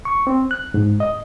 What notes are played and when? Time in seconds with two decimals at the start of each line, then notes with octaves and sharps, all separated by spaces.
0.05 C#6
0.27 C4
0.51 F#6
0.74 G#2
1.00 D#5